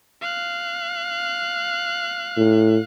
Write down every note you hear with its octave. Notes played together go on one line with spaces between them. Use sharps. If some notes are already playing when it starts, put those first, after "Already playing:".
F5 F#6
A2